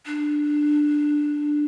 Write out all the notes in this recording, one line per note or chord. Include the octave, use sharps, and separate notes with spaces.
D4